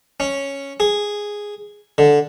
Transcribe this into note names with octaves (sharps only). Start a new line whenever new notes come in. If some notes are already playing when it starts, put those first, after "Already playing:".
C#4
G#4
D3